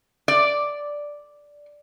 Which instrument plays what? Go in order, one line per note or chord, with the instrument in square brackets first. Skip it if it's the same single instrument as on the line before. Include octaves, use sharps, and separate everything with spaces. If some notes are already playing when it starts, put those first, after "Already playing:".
[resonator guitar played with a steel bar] D5